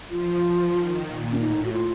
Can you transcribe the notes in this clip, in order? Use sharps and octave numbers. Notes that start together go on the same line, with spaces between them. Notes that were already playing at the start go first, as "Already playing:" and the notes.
F3 F4
F3
D#3
A#2
C#4
A2 D#4
F#4
F4